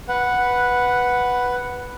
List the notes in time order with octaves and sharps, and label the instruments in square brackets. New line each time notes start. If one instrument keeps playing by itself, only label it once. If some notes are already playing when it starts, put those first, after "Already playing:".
[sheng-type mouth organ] B4 F#5